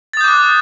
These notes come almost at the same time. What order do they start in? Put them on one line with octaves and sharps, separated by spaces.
A6 D#6 G6 D6 F#6